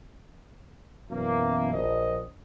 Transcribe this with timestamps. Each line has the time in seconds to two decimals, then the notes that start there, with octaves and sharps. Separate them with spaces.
1.10 F#2 B2 E3 A#3
1.72 A#1 D#5